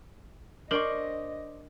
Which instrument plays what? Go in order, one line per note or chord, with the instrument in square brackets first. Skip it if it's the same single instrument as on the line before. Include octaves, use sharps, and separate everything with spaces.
[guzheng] D4 [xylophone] A#4 F#7 [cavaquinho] C5 D5 C#6 [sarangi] D#5